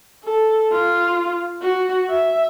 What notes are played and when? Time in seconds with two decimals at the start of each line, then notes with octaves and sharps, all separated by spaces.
0.24 A4
0.72 F4
1.62 F#4
2.10 E5